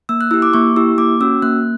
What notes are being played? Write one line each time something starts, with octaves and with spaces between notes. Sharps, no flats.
A#3 E6
F#6
E4 G4 E6
D6
A#3 C#6
E4 G4 E6
A#3 D6
C#4 F#4 E6
A#3 F#6